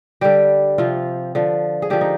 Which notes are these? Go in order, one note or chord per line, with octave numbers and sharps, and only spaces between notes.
D3 G3 G4
C3 F3 F4
D3 F3
G#4
D3 F3 G4
D#4